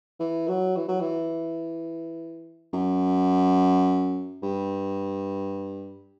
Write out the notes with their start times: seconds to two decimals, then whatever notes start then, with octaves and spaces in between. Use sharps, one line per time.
0.20 E3
0.48 F#3
0.76 E3
0.88 F#3
1.00 E3
2.73 F#2
4.43 G2